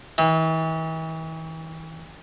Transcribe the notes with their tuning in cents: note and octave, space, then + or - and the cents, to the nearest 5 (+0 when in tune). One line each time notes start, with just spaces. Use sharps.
E3 -40